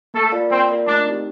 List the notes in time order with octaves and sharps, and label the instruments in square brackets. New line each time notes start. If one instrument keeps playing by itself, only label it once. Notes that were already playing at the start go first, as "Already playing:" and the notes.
[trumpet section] A3 A4 [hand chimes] A#3
[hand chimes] F4 A#4 D5 F5
[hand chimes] A#3 [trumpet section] C4
[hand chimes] F4 A#4 D5 F5
[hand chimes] A3 [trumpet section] D4
[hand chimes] C4 D#4 G4